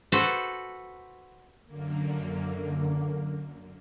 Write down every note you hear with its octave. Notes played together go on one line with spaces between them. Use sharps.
F#4 A4 B4 C5
F#2 D3 A#3